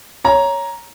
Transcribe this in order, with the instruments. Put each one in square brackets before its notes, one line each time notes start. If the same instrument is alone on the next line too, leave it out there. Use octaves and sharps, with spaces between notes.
[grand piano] C#5 A#5